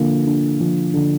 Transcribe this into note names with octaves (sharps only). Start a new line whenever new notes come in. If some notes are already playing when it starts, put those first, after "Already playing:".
Already playing: D3 F3 A#3
D4
F3
D3